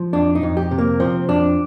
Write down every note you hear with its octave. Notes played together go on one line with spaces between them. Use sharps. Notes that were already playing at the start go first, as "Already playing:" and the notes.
Already playing: F3
F2 D4
D#4
F2
G4
C3
A#3
F3 C4
F2 D4